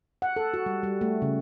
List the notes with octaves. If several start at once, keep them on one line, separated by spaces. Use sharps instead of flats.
F#5
A4
F#4
G3
G3
A3
C#3